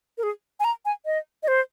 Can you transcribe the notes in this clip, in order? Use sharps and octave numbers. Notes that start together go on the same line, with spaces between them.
A#4
G#4
G#5
A#5
G#5
D#5
D#5
C5